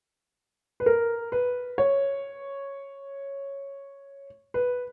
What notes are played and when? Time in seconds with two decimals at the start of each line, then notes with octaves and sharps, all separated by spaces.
0.80 B4
0.86 A#4
1.32 B4
1.78 C#5
4.54 B4